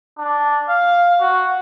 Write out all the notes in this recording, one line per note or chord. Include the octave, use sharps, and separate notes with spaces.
D4
F5
F#4